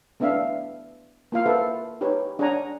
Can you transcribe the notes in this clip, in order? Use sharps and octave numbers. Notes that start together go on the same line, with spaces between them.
A3 B3 D4 E5 F5
A#3 F4 F5
A4 B4 C5 E5 F#5
D#4 G4 B4 C#5
D4 G#4 C#5 F#5 G#5 A#5